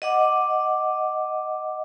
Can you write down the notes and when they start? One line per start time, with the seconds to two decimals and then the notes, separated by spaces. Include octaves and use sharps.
0.02 D#5 F#5 D6